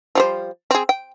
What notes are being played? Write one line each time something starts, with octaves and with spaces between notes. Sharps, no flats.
F3 G3 C5
C4 G#4
G5